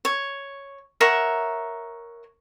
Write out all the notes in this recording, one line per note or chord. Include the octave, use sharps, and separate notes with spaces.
C#5
A#4 C#5 E5 F#5